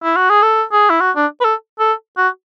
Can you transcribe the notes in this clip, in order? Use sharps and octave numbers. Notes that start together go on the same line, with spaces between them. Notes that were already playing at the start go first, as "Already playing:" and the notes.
E4
F#4
G#4
A4
G#4
E4
F#4
D4
B4
A4
A4
F#4